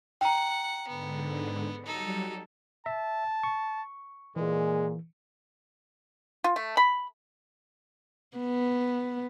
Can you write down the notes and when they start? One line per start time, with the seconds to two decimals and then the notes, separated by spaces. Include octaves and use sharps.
0.21 F#5 G5 A#5
0.88 G#2 D3 B3
1.86 F#3 G3 D#4 A4
2.86 E5 A5
3.43 C#6
4.36 A#2 E3 G#3 G#4 A#4
6.44 F4
6.56 A3
6.77 B5
8.37 B3